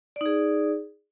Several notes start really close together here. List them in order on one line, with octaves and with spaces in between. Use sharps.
D5 D#4 G#4